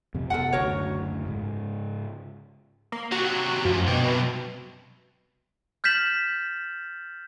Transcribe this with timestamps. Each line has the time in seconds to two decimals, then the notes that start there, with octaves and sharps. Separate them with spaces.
0.14 F2 C3 C4
0.30 F#1 C3 B3 A4 A#4 F#5
0.53 F#1 D2 F#4 A#4 C#5
1.26 G#2 C#3 G#3
2.92 A#3
3.12 C3 F#3 F#4
3.65 F#2 F3 A3
3.88 B2 D4 G5
4.05 C3 F#3
5.84 F6 G6 A6 B6 E7 F#7